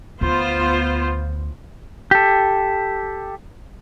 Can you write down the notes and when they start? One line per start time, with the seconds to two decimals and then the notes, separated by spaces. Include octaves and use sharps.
0.21 D2 B3 F4 C5
2.11 G4 A4